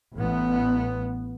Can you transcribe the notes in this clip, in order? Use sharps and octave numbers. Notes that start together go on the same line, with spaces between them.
A1 B3